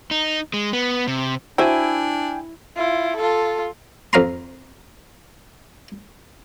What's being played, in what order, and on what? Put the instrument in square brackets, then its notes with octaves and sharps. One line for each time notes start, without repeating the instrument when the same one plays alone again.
[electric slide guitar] D#4
G#3
B3
C3
[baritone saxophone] D4 [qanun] E4 [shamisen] F#4 C5 E5 [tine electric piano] G5 G#5
[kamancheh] E4 F4
F4 A4
[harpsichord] F2 F5 A#5 C6